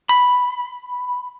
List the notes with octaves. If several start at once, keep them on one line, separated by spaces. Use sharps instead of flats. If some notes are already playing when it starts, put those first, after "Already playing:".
B5